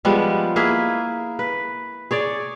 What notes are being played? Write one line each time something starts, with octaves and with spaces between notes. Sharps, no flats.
F3 G3 G#3 B3
A#3 E4 G#4 B4
B4
G#4 C#5 D5